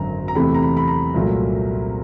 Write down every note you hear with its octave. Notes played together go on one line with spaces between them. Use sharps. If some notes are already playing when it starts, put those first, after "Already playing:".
Already playing: G#1 F#2 D3 A#5
A#5
E2 C3 E3 A3 C4 B5
A#5
B5
B5
A#5
C2 A#2 F#3 A3